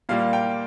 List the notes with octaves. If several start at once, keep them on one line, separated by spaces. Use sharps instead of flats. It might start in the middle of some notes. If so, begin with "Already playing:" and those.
A#2 G3 A#3 F5
G5